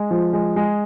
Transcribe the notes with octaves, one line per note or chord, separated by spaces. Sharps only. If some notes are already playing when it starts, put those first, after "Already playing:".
Already playing: G#3
F3
G#3
G#3